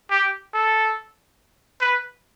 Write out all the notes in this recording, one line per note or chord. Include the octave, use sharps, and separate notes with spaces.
G4
A4
B4